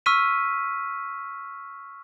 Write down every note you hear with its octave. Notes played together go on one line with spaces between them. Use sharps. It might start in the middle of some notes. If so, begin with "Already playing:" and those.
C#6 E6 F6 B6 D#7